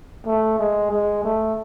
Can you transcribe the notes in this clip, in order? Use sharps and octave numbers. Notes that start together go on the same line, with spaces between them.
A3
G#3
G#3
A3